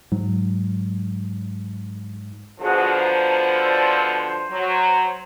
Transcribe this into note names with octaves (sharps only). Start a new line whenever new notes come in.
G#2 F#3
B2 D3 F3 F#4 G#4 F#5
A#5
C5 D5 E6
C5
F#3